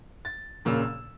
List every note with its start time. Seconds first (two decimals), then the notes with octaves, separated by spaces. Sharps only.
0.25 A6
0.65 E1 A#2 C#3 E6
0.82 E6